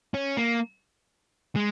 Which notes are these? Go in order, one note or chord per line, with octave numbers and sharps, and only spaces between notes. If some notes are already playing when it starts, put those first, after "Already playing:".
C#4
A#3
G#3